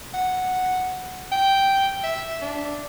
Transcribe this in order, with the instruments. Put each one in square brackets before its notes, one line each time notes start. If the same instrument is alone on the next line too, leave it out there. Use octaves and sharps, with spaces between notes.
[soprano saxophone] F#5
G5
E5
D4